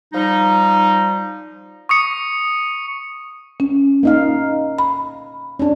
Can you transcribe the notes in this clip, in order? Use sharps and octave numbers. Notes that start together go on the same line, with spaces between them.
F3 G3 D#4
C#6 D#6 C#7
C#4
A#3 D#4 F5
B5
C#4 D4